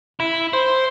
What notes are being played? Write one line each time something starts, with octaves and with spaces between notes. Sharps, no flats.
E4
C5